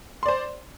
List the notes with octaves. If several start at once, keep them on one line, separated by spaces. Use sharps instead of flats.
C5 D5 C6